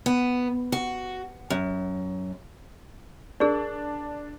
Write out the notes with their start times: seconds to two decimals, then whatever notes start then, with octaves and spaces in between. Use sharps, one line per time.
0.06 B3
0.72 F#4
1.50 F#2
3.40 D4 G#4 A#4 D5